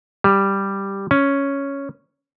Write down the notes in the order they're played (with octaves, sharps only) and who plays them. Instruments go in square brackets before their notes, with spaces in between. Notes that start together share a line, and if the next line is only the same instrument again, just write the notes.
[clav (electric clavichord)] G3
C#4